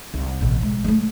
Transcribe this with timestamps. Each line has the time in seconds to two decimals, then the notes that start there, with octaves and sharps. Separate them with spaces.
0.14 C2
0.41 A1 B2
0.62 G#3
0.84 G#3 A3